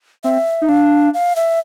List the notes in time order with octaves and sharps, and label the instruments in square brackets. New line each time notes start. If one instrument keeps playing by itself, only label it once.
[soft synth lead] C4 [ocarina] E5
[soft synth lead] D#4
[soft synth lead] D4 [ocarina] F5
[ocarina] F5
E5